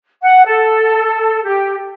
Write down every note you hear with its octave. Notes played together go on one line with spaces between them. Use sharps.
F#5
A4
G4